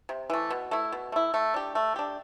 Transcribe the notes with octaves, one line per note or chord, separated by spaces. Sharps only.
C3
E3 A3
B2
A3 E4
B2
A3 E4
A3
D4 G4
A3
D4 G4